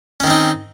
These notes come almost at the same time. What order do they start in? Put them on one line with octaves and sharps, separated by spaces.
C#4 D#3 C4 D#4